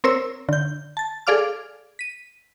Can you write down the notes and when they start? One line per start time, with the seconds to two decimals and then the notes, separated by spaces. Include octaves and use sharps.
0.04 C4 A#4 C5 C#5 E6
0.49 D3 G6
0.97 A5 A6
1.27 G#4 A4 D5 F5 D6 F6
1.99 B6 D#7